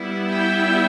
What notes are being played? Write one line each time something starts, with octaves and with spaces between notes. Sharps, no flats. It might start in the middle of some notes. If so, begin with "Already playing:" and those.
Already playing: G3 B3 E4
E5 G5